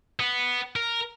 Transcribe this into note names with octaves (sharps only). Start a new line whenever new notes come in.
B3
A#4